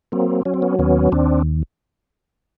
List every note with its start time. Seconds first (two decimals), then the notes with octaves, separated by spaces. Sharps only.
0.12 F#3 A#3 C4
0.45 F#3 C#4
0.54 C4
0.62 B3 C#4
0.79 D#2 B3 C#4
1.12 D#2 C4 D4